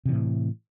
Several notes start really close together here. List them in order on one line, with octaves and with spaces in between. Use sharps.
C3 E3 A2